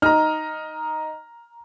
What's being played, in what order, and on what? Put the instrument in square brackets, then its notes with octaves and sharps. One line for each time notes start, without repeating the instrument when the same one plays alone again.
[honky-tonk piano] D#4 [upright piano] A#5 F6